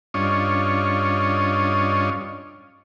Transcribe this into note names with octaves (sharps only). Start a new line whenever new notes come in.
G2 C#4 D4 F4 C#5 D#5